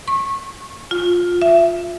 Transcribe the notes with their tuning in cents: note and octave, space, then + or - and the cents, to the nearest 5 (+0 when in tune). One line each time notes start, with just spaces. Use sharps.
C#6 -25
F4 +15
E5 +20